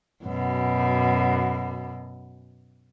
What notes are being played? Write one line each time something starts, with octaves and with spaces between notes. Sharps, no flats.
F#2 B2